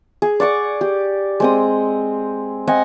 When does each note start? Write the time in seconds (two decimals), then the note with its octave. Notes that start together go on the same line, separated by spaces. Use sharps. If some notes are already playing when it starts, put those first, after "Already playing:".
0.22 G#4
0.40 D5 F#5 C#6 D6
0.81 G4
1.40 G#3 C4 D#6
2.67 C4 D#5 F#5 G#5